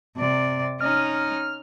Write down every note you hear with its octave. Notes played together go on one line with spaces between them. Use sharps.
C3 D5
C#4 D#4 F6